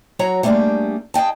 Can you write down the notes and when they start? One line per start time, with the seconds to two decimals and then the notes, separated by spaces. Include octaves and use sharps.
0.19 F#3 F#4 C#5 A#5
0.43 G3 A3 A#3 D4 G4 G#4
1.14 G#4 D#5 G5 A5